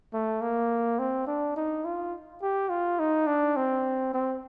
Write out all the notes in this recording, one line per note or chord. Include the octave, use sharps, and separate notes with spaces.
A3
A#3
C4
D4
D#4
F4
G4
F4
D#4
D4
C4
C4